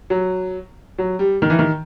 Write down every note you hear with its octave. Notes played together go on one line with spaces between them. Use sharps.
F#3
F#3
G3
D#3
E3
D#3